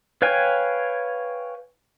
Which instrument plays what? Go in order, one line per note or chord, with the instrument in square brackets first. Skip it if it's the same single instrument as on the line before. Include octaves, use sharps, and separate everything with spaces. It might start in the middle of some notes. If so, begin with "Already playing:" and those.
[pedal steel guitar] B4 C#5 F5 G5 G#5